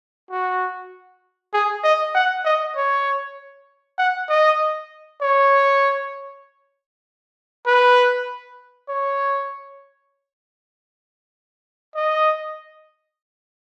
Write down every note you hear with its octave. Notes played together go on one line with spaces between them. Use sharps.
F#4
G#4
D#5
F#5
D#5
C#5
F#5
D#5
C#5
B4
C#5
D#5